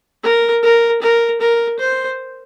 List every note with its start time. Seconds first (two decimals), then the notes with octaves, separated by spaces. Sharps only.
0.23 A#4
0.63 A#4
1.02 A#4
1.41 A#4
1.79 C5